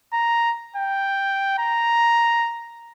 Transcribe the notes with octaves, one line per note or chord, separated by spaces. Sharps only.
A#5
G5
A#5